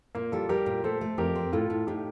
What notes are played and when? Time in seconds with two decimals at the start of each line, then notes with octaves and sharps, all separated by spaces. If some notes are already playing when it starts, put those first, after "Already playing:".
0.15 A#2 A#3
0.32 G3 F4 A4
0.49 G3 G4 A#4
0.66 A#2
0.84 A3 A4 C5
1.01 A3
1.18 F2 G4 A#4
1.35 C4
1.52 A2 F4 A4
1.70 A2
1.87 A2 D#4 G4